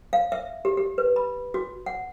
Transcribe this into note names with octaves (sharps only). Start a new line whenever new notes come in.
F5
E5
G4
G4
B4
B5
F#4
F#5